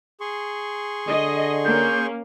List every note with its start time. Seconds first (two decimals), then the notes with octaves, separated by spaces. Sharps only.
0.20 G#4 C6 C#6
1.08 D3 D#5
1.65 A#3 C#4 G6